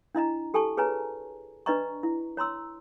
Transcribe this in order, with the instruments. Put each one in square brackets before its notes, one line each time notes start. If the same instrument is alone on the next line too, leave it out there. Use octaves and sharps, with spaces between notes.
[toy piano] D4 E4 D#5 A#5
G4 A4 G#5 A5 C#6
G#4 B4 C#5 G#5 A#5
D4 B4 D5 D#5 A#5 C#6
E4
C#5 A#5 C6 E6